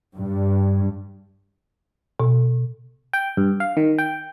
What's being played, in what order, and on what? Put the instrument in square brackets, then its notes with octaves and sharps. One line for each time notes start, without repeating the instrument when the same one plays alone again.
[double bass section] G2
[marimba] B2
[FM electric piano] G5
G2
F5
D#3
G5